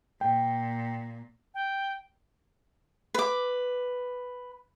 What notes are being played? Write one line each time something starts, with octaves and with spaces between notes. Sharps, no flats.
A#2 G5
G5
B4 D6